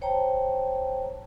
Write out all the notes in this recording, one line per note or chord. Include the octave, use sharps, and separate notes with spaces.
C5 C#5 G5 A5 A#5